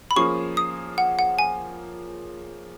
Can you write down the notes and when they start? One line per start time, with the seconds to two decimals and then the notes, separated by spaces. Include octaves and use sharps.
0.11 B5
0.16 F3 A#3 C#4 G#4 C#6
0.57 D#6
0.98 F#5
1.19 F#5
1.39 G#5